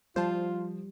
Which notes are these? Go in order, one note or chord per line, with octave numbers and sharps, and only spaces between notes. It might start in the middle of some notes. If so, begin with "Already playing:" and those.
F3 G3 F4 C5 A5